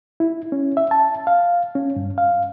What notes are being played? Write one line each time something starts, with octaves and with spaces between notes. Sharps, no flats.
E4
C#4
E5
A5
F5
C#4
G2
F5